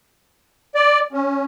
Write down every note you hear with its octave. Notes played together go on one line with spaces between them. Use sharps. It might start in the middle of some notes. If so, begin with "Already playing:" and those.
D5
C#4